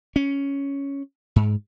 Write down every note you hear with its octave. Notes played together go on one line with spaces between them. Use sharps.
C#4
G#2